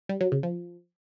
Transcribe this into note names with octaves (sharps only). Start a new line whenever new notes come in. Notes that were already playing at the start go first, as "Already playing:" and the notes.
G3
F#3
C#3
F3